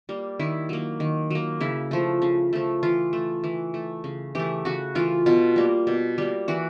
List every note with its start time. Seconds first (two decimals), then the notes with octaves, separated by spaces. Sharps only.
0.09 G3 A#3
0.39 D#3 E4
0.69 F#3 A#3
1.00 D#3
1.30 F#3 A#3
1.61 C#3 E4
1.91 F3 A3
2.22 C#3
2.53 F3 A3
2.83 E3 F4
3.13 A3
3.44 E3
3.74 A3
4.04 C#3
4.35 E3 A3 G4
4.65 C#3 F#4
4.95 E3 A3 F4
5.26 B2 F4
5.56 G3 A#3
5.87 B2
6.18 G3 A#3
6.48 E3 F#4